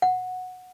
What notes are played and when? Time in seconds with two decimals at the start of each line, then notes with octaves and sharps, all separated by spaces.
0.02 F#5